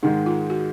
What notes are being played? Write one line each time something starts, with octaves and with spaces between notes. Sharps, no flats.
G#2 D#3 G#3 D#4
F4
F#4